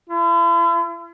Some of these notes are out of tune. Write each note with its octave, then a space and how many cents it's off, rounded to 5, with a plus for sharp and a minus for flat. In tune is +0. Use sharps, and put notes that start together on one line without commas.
E4 +45